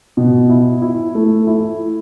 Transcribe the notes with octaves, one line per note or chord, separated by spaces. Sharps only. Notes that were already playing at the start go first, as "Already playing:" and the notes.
B2
E4
E4
A3
E4